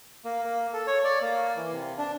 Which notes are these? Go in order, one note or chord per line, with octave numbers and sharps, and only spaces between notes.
A#3
A#3
A4
C#5
D5
A#3
E3
C3
D4